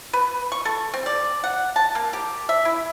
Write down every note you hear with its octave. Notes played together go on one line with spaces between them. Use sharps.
B4
C#6
A4
C4
D5
F#5
A5
A#3
G4
E5
E4